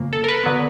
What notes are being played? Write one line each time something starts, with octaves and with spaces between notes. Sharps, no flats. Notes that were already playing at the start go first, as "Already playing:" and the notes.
Already playing: F2 C#3 A#3
A4
A#4
B4
D3 F#3 B3